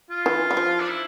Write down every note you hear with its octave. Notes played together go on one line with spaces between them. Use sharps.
F4
E3
G3
F3
D4
E4